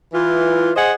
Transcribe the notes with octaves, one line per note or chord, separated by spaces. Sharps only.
E3 F4
G#4 C5 D#5 F#5